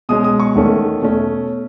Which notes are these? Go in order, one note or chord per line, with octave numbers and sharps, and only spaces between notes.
B2 G#3 C#4 D#6
D#6
C#6
E2 D#3 A3 C#4
B2 A3 C#4